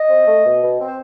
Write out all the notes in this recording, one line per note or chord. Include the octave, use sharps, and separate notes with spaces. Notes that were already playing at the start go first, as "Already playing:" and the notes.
Already playing: D#5
C4
A3
B2
B2
C4
C5